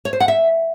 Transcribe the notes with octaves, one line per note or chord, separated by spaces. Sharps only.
C#5
C5
F#5
E5